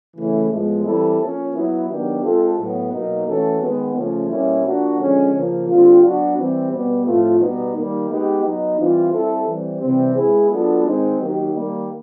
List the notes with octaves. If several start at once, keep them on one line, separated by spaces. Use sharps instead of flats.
C#3 E3 A3 C#4 E4
A2 F3 G#3 B3
E3 G3 C4 E4 A4
F3 A#3 C#4
F#3 B3 E4
D#3 F#3 B3 D4 G4
G#3 C4 F4 A4
A2 F#3 B3
B2 F#3 A#3 D#4
E3 A3 C#4 F#4 A4
D#3 G#3 B3
C#3 F3 A3 C#4
B2 G3 A#3 C#4 E4
F3 A#3 D4 F#4
D3 F3 G#3 C#4
C#3 F3 A#3
D3 G3 C4 F4
F#3 B3 D4 F#4
E3 G3 C4
B2 G3 B3
A2 F3 A3 C4 F4
B2 G3 B3 D#4
D#3 G3 A#3 D#4
G#3 B3 D#4 G4
F#3 B3 D#4
E3 G3 C4 F4
G3 C4 E4 A4
E3 G3 C4
C3 E3 G3 C4
G#3 B3 E4 G#4
F#3 B3 D4 F4 A4
D#3 G#3 C4 D#4
D#3 F#3 A#3 D#4 G4
D#3 G3 A#3